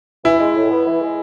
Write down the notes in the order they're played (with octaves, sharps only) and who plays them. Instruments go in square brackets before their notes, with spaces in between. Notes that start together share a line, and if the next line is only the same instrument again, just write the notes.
[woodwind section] E3 [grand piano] E4
[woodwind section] G#3
A2
B3
E3
G#3